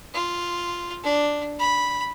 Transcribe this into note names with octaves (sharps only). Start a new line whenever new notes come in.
F4
D4
B5